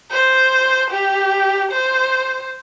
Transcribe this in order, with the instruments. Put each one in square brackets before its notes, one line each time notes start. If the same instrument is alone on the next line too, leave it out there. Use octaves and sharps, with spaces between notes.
[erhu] C5
G4
C5